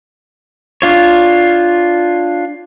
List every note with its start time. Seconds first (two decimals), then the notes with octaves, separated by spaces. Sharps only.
0.82 D4 F4 C#5